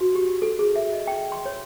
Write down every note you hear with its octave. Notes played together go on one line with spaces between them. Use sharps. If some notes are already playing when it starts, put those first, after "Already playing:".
F#4
G4
A4
G#4
E5
D#5
G5
C6
C#5